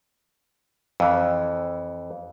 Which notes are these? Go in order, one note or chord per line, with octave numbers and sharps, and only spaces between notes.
F2 E3